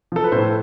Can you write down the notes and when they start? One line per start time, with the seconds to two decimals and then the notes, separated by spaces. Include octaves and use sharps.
0.12 F3 A4
0.24 B4
0.32 A2 C5
0.44 A4